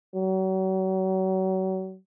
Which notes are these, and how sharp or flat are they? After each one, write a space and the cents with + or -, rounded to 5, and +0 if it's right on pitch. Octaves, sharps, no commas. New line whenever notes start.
F#3 +35